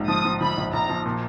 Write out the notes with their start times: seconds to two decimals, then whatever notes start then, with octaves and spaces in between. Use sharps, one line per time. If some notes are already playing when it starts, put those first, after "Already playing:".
Already playing: A#1 G#2
0.08 F3 D#6
0.25 F3
0.41 F3 B5
0.57 A#1
0.73 A#1 A#5
0.89 F3
1.05 A#2